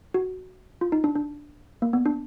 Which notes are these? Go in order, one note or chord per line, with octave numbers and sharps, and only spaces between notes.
F#4
F4
D#4
D4
D4
A#3
B3
D4